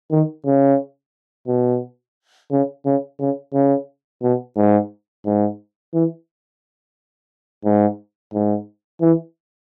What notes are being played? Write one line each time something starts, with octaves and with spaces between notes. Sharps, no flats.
D#3
C#3
B2
C#3
C#3
C#3
C#3
B2
G#2
G#2
E3
G#2
G#2
E3